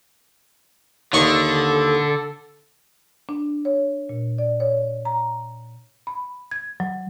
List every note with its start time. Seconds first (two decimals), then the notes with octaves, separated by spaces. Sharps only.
1.13 D#2 D3 A4 D#5 C#6
3.29 D4
3.65 C#5
4.09 A#2
4.38 D5
4.60 C#5
5.05 A#5
6.07 B5
6.51 G#6
6.80 F#3